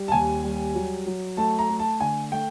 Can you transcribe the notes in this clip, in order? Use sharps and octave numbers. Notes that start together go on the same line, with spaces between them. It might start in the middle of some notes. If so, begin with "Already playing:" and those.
Already playing: G3
A5
D#2 G#5
G3
F#3
F#3
A3 A5
A#5
A3
A5
D3 G#5
A3 G5